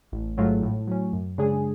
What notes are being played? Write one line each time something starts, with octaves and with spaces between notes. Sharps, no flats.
A1
G#2 F#3 A3 F4
A2
F#3 C#4
F#2
C#3 G#3 D4 G#4